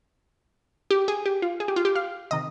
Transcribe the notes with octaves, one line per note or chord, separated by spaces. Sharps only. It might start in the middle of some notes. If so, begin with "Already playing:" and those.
G4
G#4
G4
F4
G#4
G4
F4
G4
F5
C3 D#3 D#5